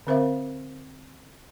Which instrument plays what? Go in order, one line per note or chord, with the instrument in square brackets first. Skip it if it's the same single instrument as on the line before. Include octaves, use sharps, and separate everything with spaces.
[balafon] D3 C4 A#4 C5 E5 F5